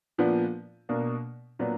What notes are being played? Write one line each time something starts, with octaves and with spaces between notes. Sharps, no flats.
A#2 F3 B3 D4
B2 A#3 D4
A#2 F#3 B3 D4